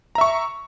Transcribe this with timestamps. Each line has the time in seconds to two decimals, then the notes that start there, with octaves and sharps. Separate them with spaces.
0.15 A#5
0.18 E5
0.21 C#6